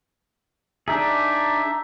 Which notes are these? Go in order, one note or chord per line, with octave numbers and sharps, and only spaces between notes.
D4 D#4 G#4 E5